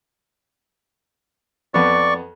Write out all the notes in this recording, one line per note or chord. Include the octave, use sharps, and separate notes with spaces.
F2 B3 D5 C#6